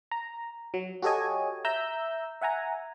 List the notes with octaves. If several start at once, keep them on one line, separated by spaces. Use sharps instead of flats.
A#5
F#3
F#4 G4 A4 C#5 D#5 G#5
E5 A#5 E6 G6
E5 F#5 G#5 A#5